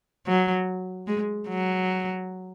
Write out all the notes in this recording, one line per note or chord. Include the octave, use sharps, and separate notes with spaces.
F#3
G#3
F#3